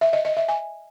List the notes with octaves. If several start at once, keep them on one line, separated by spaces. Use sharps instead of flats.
E5
D#5
D#5
E5
G#5